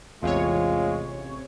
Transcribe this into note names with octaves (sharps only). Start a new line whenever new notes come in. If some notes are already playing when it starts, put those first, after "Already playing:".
A1 E2 C3 G#3 F4 C#5